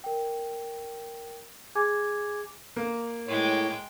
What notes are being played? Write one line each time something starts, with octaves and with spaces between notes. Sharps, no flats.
A#4 G5
G#4 G#5 D6 G#6
A#3
A2 G#3 C#5 G5